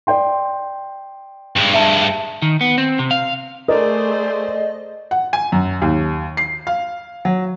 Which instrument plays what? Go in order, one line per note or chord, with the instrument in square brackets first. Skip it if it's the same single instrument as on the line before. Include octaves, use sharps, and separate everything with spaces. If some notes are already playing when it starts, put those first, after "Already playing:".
[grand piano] D5 G5 C6
[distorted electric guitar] G2 G#3
[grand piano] E5 A5
[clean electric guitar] D#3
B3
C4
C3
F5
[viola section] A3 G#4 C5 [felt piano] A#4 [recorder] D5 [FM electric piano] D#5
[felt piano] F#5
G#5
F#2
D#2
C7
F5
F#3